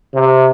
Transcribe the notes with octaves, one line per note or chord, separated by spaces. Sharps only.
C3